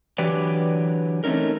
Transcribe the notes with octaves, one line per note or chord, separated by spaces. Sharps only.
D3 E3 F#3 G4 B4 D5
A3 C4 C#4 D#4 A#4